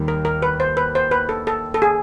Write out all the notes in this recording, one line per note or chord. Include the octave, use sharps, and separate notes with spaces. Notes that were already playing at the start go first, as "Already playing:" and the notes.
Already playing: D#2 D#3 G3
A#4
A#4
B4
C5
B4
C5
B4
A4
A4
A4
G#4